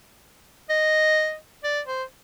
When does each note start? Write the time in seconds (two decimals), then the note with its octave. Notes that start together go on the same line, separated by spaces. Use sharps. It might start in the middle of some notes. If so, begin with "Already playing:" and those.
0.70 D#5
1.64 D5
1.87 C5